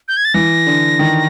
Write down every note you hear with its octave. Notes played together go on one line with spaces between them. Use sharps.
G6
G#6
A6
E3 A#6
D3
D#3